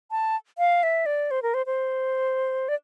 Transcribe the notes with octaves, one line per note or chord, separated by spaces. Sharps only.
A5
F5
E5
D5
C5
A#4
C5
C5
D5